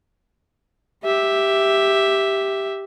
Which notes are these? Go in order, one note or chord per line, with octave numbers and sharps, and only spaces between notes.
G4 E5